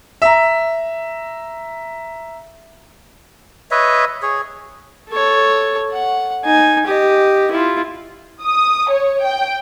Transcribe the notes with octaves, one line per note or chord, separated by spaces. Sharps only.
E5 A#5
B4 C#5 D#5 E5
G#4 C#5
A4 C#5
F#5
D#4 G#5
G4 D#5
E4 F4
D#6
C#5
G5